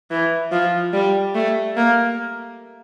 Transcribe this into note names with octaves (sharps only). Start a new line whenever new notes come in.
E3
F3
G3
A3
A#3